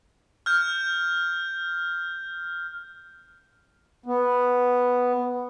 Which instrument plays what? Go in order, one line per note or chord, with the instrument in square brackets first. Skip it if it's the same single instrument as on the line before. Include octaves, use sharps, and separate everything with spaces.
[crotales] F6 G6
[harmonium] B3